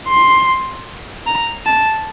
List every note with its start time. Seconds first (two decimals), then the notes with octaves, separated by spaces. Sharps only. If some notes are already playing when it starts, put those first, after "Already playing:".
0.09 C6
1.27 A#5
1.66 A5